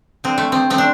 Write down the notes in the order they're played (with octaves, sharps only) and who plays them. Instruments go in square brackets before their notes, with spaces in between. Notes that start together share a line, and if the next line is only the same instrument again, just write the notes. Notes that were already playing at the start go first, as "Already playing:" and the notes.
[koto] D3 C4
A3
C4
A3 C4
D4